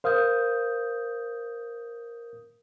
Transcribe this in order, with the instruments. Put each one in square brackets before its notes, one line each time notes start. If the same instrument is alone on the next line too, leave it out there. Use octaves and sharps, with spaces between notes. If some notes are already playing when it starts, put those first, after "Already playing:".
[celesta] A#4 D#6 G6 [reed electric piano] C5 F5